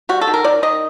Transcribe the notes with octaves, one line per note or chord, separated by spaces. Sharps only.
G3 F#4
A4
D#3
A#4
D#3 D5
D#3 D#5